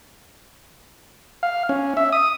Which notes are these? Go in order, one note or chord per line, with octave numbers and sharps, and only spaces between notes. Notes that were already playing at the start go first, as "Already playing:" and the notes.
F5
C#4
E5
D#6